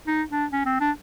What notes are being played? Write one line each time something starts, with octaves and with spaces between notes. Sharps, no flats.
D#4
D4
C#4
C4
D4